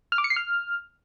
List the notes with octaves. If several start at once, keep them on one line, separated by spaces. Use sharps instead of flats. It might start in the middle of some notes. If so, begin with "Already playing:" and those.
F6
D6
C#7
C7
F6